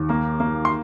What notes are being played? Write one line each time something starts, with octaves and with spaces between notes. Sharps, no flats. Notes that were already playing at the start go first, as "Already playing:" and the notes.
Already playing: D#2
A#3 A#5
A#3
C6